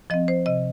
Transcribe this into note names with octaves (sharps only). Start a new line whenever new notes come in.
F3 C4 D#5
C5
C3 D#5